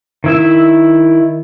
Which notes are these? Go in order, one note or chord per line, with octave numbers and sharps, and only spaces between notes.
D#3 E4 E6